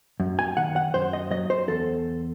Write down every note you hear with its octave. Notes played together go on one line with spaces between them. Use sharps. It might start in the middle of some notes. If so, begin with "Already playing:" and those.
F#2
G#5
D#3 F#5
F#5
F#2 C5
D#5
F#3 D#5
C5
E2 A4